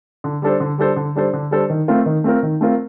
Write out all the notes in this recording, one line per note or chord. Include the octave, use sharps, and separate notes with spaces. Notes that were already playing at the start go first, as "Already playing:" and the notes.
D3
G3 D4 A4 C5
D3
G3 D4 A4 C5
D3
G3 D4 A4 C5
D3
G3 D4 A4 C5
D#3
A3 C4 F4 A#4
D#3
A3 C4 F4 A#4
D#3
A3 C4 F4 A#4